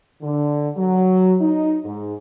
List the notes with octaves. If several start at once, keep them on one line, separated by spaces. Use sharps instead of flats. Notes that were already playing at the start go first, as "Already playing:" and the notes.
D3
F#3
D#4
G#2